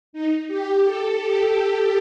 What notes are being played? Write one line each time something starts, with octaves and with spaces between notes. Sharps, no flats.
D#4
G4
A4
G4